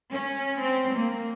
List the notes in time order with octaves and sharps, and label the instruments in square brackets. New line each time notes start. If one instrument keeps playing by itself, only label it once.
[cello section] C#4
C4
A#3